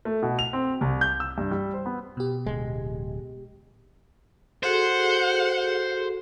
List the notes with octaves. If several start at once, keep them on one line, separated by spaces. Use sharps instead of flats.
A3
B2
F7
C4
C2
G6
E6
G2
G3
C5
B3
B2 G4
D1 G#3
F#4 G#4 A4 C5 F#5